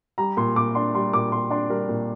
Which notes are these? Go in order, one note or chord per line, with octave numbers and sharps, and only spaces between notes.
G3 A#5
A#2 C6
A#2 D6
D4 C6
G3 C6
A#2 D6
A#2 C6
D4 C6
G3 A#4
A#2